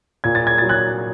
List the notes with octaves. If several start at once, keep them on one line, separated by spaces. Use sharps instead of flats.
A#2 G#6
A6
G#6
F#3 A6
F#6 G#6